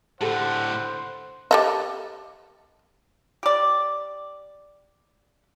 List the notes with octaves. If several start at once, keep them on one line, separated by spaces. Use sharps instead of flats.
A2 D3 G4 A4 C5 F#5
G4 A4 D#5
G4 D5